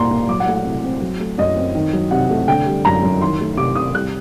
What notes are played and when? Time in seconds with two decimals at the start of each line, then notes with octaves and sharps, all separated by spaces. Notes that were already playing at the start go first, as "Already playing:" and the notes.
Already playing: A#2 G3 A#3 A#5 C6
0.11 A#2
0.29 F#3 D6
0.40 F#5
0.47 A3
0.53 F#5
0.64 C3
0.84 C4
1.02 F#3
1.19 A3
1.38 F#2 D#5
1.56 C4
1.75 D#3
1.93 F#3
2.11 C3 F#5
2.30 A3
2.48 D3 G5
2.66 G3
2.85 F#2 A#5
3.03 F#2
3.22 D#3 C6
3.40 A3
3.57 C3 D6
3.75 C3 D#6
3.94 G3 F#6